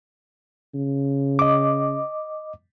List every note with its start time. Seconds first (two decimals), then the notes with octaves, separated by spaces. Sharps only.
0.74 C#3
1.39 D#5 D6